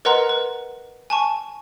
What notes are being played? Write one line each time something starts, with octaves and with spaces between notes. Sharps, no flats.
A#4 B4 D#5 F#5 A#5 C6
B4
G#5 A5 C#6